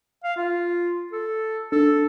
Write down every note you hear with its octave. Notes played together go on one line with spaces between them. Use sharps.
F5
F4
A4
D4 A4